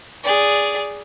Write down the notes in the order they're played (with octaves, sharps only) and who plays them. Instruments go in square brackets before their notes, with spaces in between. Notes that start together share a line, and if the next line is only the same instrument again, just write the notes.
[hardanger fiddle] G#4 D5